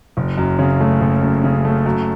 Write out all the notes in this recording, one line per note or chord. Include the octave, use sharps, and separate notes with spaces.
F#1
F#2
C#3
A3
F#1
F#2
C#3
A3
F#2